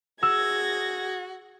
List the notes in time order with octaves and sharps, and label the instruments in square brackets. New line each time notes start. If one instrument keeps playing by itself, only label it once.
[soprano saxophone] F#4 [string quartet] G#4 G#6 A#6 [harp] E6